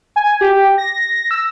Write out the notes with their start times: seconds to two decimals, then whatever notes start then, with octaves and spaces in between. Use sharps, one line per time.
0.16 G#5
0.41 G4
0.78 A#6
1.31 E6